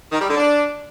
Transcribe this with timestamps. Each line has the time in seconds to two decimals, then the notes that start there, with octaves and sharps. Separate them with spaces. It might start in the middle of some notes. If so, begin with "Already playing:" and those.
0.12 D#3
0.20 G3
0.28 D3
0.36 D4